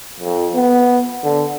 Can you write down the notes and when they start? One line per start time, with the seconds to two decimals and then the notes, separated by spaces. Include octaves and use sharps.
0.20 F2
0.55 B3
1.24 D3